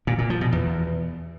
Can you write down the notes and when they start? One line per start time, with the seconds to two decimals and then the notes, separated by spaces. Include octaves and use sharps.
0.07 A#2
0.19 A#2
0.30 F3
0.41 B2
0.52 E2